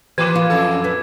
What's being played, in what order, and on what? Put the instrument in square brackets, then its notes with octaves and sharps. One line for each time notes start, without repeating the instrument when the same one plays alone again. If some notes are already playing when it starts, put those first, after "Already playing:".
[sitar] E3 A#3 B4 [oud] G4 [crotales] D6 G#6
[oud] F4
[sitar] F2 A4
[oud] B3